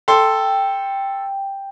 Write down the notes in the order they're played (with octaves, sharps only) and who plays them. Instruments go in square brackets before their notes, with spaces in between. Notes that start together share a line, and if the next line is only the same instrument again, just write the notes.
[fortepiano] A4 C6 [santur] G5